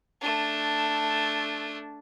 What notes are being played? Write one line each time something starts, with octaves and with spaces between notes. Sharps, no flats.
A3 D4